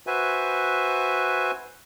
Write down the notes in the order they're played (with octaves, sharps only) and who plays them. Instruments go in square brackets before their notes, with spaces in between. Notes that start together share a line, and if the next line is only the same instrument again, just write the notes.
[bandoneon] F#4 B4 C5 E5 G#5